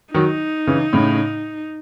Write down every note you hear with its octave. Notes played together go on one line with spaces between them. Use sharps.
D#3 F#3 D#4
C#3 E3
A2 C#3